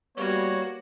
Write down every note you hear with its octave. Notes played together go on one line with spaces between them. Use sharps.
G3 A#3 B3 F#4 C#5